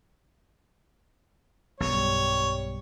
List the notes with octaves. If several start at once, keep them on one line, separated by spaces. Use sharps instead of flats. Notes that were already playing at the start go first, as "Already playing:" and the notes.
B1 G2 B2 G3 C#5